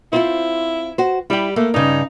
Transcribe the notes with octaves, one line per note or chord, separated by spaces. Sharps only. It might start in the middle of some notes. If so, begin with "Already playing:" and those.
C4 E4 F4 C5
F#4 C5
G3 E4 G4
A3 A#3
G2 C#3 D#4